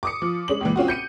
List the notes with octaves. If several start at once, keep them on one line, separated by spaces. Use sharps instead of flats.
D6 D#6 C#7
F3
G#3 C#4 F#7
C#2 A#2 E3
C4 C#4 F4 F#4
G6 C#7 D#7